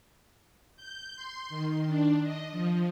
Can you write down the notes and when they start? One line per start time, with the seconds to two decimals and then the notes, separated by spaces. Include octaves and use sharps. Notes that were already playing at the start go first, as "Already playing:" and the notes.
0.77 G6
1.16 C6
1.49 D#3
1.87 D4
2.23 D#5
2.52 F3